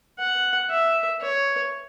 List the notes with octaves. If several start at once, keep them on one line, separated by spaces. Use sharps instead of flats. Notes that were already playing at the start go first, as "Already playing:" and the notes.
F#5
E5
C#5